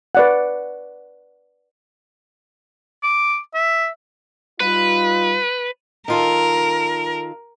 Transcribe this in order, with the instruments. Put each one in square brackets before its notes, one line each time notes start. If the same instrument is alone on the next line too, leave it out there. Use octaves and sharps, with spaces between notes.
[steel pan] B4 D5 F#5
[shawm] D6
E5
[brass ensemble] G3 D#4 F4 [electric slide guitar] B4
[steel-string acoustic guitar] D#3 F4 A4 [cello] A#4